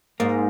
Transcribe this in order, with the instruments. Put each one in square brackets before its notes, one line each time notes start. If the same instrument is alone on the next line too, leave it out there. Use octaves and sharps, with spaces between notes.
[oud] G#2 [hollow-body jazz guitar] A#3